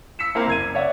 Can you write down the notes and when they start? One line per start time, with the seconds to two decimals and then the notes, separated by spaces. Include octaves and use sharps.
0.19 E6 B6 C#7 E7
0.35 A#3 C4 E4 A#4 C5 F5
0.47 F#1 G#6 D#7
0.75 C#5 D5 E5 F#5